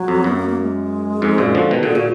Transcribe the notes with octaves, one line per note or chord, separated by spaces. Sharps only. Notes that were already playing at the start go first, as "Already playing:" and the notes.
Already playing: F#3
F2
F#2 B3
A#3
A#3
G#3
F2 G#2
F#2 A#2
D3 F3
B2 D#3
A#2 D3 G#4
A#2 F#4